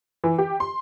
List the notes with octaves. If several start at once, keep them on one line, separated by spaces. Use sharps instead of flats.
E3
G4
C6